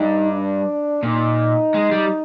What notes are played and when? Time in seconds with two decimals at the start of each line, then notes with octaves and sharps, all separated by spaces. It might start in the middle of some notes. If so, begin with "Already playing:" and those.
Already playing: G2 D#4
0.33 D4
1.03 A#2 D#4
1.74 G#3
1.91 G3